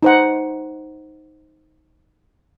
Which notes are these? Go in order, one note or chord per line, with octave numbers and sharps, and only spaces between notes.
D#4 C5 F#5